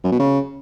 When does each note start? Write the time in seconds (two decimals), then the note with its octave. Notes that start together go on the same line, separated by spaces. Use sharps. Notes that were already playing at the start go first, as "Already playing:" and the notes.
0.04 F#2
0.12 B2
0.19 C#3